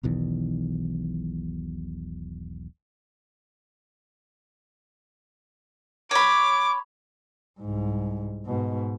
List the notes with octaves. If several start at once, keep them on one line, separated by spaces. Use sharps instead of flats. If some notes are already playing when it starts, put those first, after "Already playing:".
E1 B1 E2 D#3
C#5 B5 D6
C2 G#2
G#2 B2